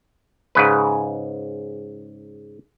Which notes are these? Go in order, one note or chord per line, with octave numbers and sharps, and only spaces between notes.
G#2 C#3 B4